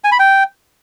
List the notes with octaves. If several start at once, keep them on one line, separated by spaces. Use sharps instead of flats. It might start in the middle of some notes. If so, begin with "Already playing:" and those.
G#5
B5
G5